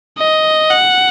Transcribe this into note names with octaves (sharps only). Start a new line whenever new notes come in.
D#5
F#5